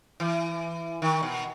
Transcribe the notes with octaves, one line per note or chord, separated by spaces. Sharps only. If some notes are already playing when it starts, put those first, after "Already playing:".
E3
D#3
B2